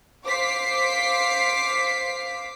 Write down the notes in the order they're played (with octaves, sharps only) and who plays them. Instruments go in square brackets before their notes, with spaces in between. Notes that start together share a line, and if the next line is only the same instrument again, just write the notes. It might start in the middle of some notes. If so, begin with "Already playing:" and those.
[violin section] C5 F5 D6 B6 C7